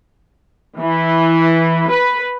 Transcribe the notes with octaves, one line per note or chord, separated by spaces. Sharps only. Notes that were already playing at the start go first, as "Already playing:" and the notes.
E3
B4